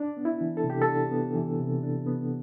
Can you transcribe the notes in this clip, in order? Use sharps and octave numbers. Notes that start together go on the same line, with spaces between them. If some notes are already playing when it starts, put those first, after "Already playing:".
Already playing: D4
B3
E4
E3
A4
C3
G4
A4
D4
B3
E3
C3
D4
B3